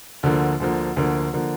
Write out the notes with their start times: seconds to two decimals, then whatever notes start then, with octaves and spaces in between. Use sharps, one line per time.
0.23 D2 D3 F3 A#3
0.60 D2 D3 F3 A#3
0.97 D2 D3 F3 A#3
1.33 D3 F3 A#3